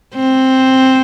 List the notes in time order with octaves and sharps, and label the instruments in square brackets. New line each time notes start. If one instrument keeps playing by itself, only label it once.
[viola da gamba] C4